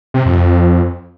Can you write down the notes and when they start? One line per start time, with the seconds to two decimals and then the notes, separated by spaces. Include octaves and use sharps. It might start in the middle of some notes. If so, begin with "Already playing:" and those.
0.14 C3
0.26 F2
0.37 F2